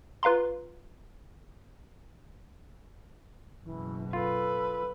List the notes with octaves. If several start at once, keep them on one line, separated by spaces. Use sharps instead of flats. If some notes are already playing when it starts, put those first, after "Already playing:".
F4 B4 F5 A#5 C6
F#1 B2 E3
F4 A4 B4